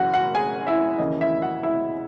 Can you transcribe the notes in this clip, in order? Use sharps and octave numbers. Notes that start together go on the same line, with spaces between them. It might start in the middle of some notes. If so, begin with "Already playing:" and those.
Already playing: F#1 F#2 C#3 E3 F#4 F#5
F#4 F#5
G#4 G#5
E4 E5
D#2 C#3 E3 D#5
E4 E5
F#4 F#5
E4 E5